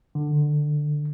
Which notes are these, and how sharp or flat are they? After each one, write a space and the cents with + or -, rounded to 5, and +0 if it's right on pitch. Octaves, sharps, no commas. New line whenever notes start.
D3 +15